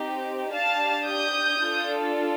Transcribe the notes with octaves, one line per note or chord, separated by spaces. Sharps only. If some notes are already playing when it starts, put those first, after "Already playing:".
Already playing: C4 D#4 G4
D4 G4 F5 A5
D#6 G6
D4 F4 A4